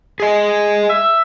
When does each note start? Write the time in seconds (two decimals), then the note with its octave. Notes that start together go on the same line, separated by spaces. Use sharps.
0.20 G#4 D#5
0.90 E5